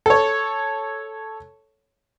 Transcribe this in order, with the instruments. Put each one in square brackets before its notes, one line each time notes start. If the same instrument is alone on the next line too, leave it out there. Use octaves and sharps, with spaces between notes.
[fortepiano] A4 C#5